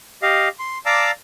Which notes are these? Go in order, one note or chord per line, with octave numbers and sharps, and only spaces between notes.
G4 D#5 F5
C6
D5 F5 A5 A#5 D6 E6